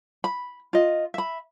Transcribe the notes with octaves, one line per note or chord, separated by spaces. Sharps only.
B5
F4 D#5
E5 B5